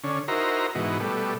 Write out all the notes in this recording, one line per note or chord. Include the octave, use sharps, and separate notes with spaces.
D3 C#4
D#4 E4 F#4 A#4 C5 A#5
G#2 B2 E3 D#4 F#4
B2 G3 A3